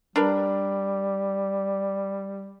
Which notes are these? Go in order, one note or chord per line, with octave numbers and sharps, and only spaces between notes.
G3 D4 A#4 B4